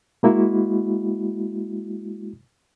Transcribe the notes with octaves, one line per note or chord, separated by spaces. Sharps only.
G#3 A#3 E4 F#4